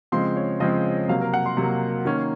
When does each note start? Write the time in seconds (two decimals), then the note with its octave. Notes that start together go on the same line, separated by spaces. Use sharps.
0.12 C#3 F3 G#3 C4 C6
0.37 C#5
0.60 C#3 F3 G#3 C4 D#5
1.08 C3 F#3 A#3 F5
1.21 A#4
1.34 F#5
1.46 C6
1.57 C3 F#3 A#3
2.05 D#3 A#3 C#4